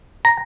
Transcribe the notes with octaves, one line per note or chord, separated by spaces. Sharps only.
A#5